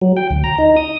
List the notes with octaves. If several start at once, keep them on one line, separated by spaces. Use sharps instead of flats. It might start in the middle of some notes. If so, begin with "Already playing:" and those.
F#3
G5
D2
A#5
D#4
D#6